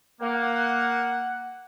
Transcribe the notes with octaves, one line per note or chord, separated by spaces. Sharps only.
A#3 F#5